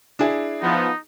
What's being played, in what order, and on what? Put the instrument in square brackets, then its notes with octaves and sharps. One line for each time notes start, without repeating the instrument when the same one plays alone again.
[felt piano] D4 E4 G#4
[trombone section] F3 B3 [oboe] D#4